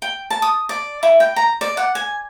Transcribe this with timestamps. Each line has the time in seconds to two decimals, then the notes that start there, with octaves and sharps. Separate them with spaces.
0.02 G5
0.30 A5
0.42 D#6
0.69 D5
1.03 E4
1.20 G5
1.36 A#5
1.61 D5
1.77 F#5
1.95 G#5